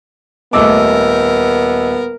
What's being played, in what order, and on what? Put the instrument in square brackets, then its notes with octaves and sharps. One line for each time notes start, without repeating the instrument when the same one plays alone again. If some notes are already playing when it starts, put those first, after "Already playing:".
[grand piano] D#1 A3 D6 [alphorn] B3 [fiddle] A#4 [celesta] D#5 E6